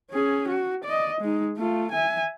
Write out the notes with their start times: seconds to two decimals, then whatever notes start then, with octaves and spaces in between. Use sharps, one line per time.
0.11 C#4 G#4
0.48 F#4
0.84 D5 D#5
1.21 G#3 D#4
1.58 A3 F4
1.91 E5 G#5